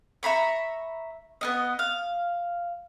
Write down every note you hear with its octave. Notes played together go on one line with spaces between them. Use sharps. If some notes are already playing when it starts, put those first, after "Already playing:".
E5 A#5 B5 C#6
B3 C#4 D#5
F5